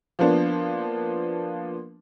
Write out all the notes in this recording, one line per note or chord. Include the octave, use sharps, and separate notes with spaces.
F3 A#3 B3 D4